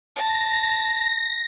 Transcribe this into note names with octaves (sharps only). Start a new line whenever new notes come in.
A5 A#6